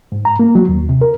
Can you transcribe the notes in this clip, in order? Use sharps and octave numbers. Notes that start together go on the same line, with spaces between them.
G#2
A#5
A#3
F#3
D#2
C3
A#4